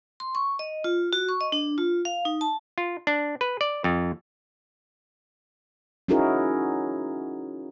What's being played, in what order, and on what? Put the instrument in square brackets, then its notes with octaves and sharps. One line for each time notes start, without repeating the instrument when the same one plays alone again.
[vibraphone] C6
C#6
D#5
F4
F#4
C#6
D#5
D4
F4
F5
D#4
A5
[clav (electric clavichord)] F4
D4
B4
D5
F2
[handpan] C#4 D#4 E4 F#4 G#4 A#4